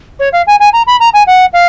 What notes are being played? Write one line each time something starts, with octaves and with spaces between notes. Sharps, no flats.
C#5
F5
G#5
G#5
A#5
B5
A#5
G#5
F#5
F5